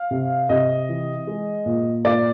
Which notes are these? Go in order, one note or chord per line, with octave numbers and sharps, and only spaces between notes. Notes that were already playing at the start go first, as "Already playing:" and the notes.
Already playing: F5
C3
C3 D#5
E3
G#3
A#2
A#2 D5